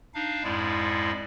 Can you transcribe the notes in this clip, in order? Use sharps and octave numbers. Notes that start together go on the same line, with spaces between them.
D4 D#4 F5
F2 G#2 G#3 E4 D5